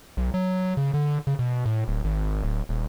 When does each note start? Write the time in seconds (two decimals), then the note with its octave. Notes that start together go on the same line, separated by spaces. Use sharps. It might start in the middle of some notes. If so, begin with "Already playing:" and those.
0.17 B1
0.34 F#3
0.77 C#3
0.94 D3
1.27 C#3
1.39 B2
1.66 A2
1.88 D1
2.04 G#1
2.43 D1
2.69 D#1